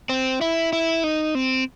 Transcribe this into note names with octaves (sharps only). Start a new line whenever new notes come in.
C4
E4
E4
D#4
C4